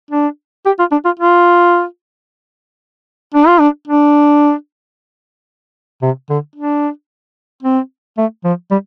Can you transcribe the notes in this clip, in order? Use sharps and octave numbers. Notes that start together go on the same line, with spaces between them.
D4
G4
F4
D4
F4
F4
D4
F4
D4
D4
C3
D3
D4
C4
A3
F3
G3